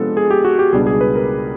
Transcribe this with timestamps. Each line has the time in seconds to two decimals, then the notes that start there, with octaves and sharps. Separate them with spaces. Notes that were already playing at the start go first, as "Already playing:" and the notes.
Already playing: C3 F3 G#3 B3 D4 A4
0.17 G#4
0.31 G4
0.45 F#4
0.59 G4
0.73 C#2 B2 G3 B3 D4 G#4
0.87 G#4
1.01 B4
1.15 A#4